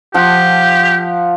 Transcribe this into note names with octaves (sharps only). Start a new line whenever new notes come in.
F3 F4 G4 F#5